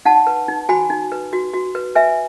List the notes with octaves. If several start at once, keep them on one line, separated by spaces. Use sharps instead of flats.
D#4 F#5 A5
B4
D#4
F#4 G#5 B5
D#4
B4
F#4
F#4
B4
B4 E5 G#5